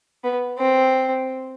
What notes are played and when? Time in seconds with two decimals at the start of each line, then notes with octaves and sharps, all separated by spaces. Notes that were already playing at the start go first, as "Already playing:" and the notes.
0.24 B3
0.59 C4